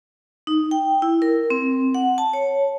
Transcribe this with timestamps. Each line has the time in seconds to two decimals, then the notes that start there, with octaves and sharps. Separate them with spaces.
0.47 D#4
0.71 G5
1.02 E4
1.22 A#4
1.50 C4
1.95 F#5
2.18 A5
2.33 C#5